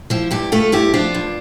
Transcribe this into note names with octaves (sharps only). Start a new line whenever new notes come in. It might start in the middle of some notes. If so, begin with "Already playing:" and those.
F3 E4 G4
G2 E4 G4
A3 F4 A4
G2 E4 G4
F3 D4 F4
G2